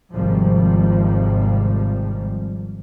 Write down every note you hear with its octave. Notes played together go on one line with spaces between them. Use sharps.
G#1 C3 F3 G3